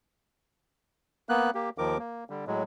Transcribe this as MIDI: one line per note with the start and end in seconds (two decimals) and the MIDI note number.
1.29 1.50 58
1.29 1.50 59
1.29 1.50 90
1.55 1.70 58
1.55 1.70 67
1.78 1.98 39
1.78 1.98 51
1.78 1.98 53
1.78 1.98 70
1.78 1.98 86
1.99 2.24 58
2.30 2.45 50
2.30 2.45 55
2.47 2.63 45
2.47 2.63 54
2.47 2.63 56